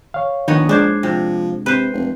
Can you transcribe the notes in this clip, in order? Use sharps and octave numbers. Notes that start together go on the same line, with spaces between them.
C#5 F5
A#1 D#3 B3 D#4 C#5
G#3 D4 C5 D5 G#6
C3 F3
C3 B4 C5
F1